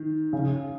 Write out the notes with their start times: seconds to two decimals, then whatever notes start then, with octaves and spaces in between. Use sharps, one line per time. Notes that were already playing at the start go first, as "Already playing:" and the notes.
Already playing: D#3
0.33 C#3